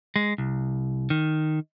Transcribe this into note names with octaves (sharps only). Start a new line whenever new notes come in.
G#3
C2
D#3